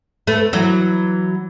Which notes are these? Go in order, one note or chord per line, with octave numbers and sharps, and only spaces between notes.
A3 B3
E3 F#3